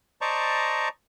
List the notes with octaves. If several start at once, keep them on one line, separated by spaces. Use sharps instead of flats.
C5 D5 D#5 A5 A#5 C#6